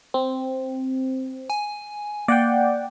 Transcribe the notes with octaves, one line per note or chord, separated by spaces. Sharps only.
C4
G#5
A#3 D5 F#5 G5